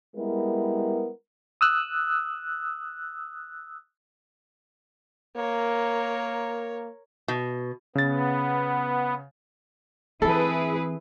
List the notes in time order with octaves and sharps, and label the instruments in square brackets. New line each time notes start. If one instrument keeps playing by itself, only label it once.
[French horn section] G3 G#3 B3 E4 A#4
[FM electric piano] D#6 E6 F#6
[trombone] A#3 [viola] A#4 C#5
[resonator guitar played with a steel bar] B2
[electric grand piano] C#3 A6 [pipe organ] B3
[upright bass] E3 C4 [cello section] E4 G#4 B4 [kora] A4